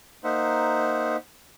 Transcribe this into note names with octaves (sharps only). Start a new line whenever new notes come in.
A#3 D#4 C5 E5 F#5